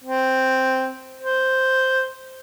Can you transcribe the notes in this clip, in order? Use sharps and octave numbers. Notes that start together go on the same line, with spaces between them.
C4
C5